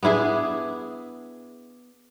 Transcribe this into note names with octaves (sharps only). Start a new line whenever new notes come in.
B3 D4 E4 G#4